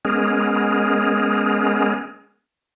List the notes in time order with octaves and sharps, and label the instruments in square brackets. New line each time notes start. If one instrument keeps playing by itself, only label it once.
[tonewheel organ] G#3 B3 C#4 G#4 A#4